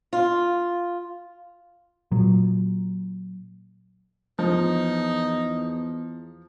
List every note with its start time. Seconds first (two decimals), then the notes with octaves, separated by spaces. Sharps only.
0.13 F4
2.11 A#2 F#3
4.39 E2 F3 D#4